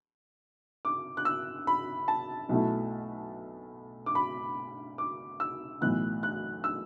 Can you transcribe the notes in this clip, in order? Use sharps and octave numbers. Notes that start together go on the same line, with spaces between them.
D6
F#6
E6
B5
A5
B1 B2 A3 E4
D6
B5
D6
E6
B1 A2 E3 B3 F#6
F#6
E6